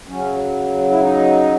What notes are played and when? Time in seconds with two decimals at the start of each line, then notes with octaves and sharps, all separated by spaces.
0.07 C#3 F#3 C#4
0.90 E4
1.00 D#4